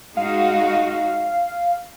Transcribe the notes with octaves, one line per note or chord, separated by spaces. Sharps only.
G#3 D#4 F#4 F5